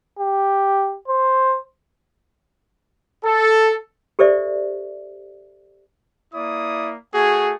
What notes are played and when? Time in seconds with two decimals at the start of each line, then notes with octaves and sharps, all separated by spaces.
0.19 G4
1.08 C5
3.25 A4
4.19 G4 A4 C5 D5 E5
6.34 A#3 E4 D5 D#6
7.14 A3 F#4 G#4